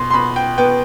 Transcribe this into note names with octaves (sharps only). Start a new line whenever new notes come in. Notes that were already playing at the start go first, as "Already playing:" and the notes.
Already playing: B2 C6
C6
B2 B5
G5
B3 G5